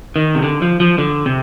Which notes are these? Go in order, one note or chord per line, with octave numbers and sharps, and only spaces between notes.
D#3
C3
D3
F3
F3
D3
C3